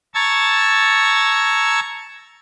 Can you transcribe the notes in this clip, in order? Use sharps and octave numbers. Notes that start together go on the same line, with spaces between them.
A5 A#5 C#6 E6 G#6 A6